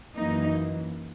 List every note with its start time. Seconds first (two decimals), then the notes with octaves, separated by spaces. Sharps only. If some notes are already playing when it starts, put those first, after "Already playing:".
0.15 F#2 E3 A#3 D#4